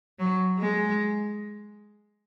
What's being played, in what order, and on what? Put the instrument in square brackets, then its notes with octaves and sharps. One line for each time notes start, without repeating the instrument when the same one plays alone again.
[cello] F#3
G#3